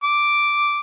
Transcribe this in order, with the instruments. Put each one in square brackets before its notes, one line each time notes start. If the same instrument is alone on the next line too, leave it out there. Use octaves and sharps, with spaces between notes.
[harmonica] D6